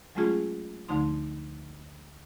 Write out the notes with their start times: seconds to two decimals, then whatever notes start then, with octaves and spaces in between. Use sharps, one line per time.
0.15 F#3 G#3 A3 C#4 F4 G#4
0.88 D2 D3 F3 A3 D#4 C6